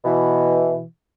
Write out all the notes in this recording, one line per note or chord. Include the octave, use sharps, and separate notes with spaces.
B2 E3